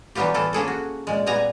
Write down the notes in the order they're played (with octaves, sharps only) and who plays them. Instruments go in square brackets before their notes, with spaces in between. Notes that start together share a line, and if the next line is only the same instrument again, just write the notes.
[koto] E3 F#3 G3 B3 F4 G4
A2 E3 E4 F4 A4
A#3 C#4 G#4 A4
F#4
A#2 G#3
A#2 G3 B3 G#5 A#5